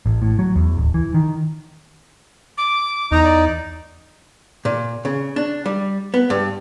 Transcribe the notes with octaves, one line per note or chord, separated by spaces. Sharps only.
A1
A2
F#3
E2
D1
E3
D#3
D6
E2 D#4 A#5
D5
A#2
C#3
D4
G3
B3
G2